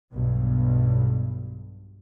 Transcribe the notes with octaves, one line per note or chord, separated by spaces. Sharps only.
B1 G2 B2